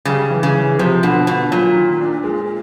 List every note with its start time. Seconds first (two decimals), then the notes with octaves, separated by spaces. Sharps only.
0.05 C#3 G3
0.31 E3
0.43 C#3
0.54 E3
0.79 C3 F3
1.03 B2 D3
1.27 B2 D3
1.51 A#2 F#3
1.75 D#3
2.00 D4
2.24 G#3